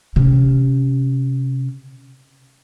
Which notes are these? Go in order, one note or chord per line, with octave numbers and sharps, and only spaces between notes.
C3 C#4